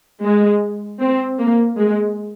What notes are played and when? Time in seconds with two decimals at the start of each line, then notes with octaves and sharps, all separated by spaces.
0.23 G#3
1.01 C4
1.39 A#3
1.79 G#3